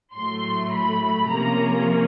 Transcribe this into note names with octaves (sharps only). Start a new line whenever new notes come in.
A2 F#3 A3 C6
B5
C3 F3 A#3 C#4 A#5